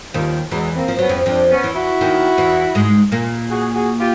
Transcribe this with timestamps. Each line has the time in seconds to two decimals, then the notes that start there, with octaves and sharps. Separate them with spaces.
0.14 D#2 D#3 F3 G3
0.51 E2 E3 F#3 G#3
0.76 A#3 C4
0.88 F3
0.99 F#3 B3 C#4
1.09 F2 F3
1.26 F2 F3 C4 D4
1.50 B3 C#4
1.63 E2 E3
1.75 E4 F#4
2.01 D#2 D#3
2.38 E2 E3
2.75 G#2 G#3
3.12 A#2 A#3
3.50 F#4 G#4
3.74 F#4 G#4
3.99 F4 G4